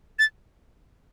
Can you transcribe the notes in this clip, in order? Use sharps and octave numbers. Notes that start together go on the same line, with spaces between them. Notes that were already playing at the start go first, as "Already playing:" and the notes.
A6